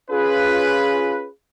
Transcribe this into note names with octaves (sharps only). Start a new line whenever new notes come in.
C#4 F4 G#4 B4